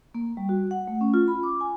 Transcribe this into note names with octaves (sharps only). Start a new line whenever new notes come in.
A#3
G3
F#4
F#5
A3
C#4
F4
B5
D6
G#5